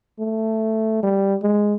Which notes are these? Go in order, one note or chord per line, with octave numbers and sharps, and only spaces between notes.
A3
G3
G#3